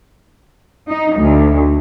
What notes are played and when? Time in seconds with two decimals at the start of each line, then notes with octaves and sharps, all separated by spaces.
0.90 D#4
1.19 D2